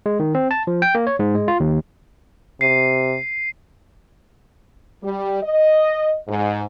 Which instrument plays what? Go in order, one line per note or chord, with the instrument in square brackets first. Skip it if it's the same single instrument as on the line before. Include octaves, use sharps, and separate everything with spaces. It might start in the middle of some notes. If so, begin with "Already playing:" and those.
[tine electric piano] G#3
D#3
C4
A5
F3
G5
A#3
C#5
G#2
G#3
F4
D#2
[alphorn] C3 [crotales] C7 D#7
[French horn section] G3
D#5
G#2